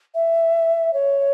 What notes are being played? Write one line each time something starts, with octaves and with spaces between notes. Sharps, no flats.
E5
C#5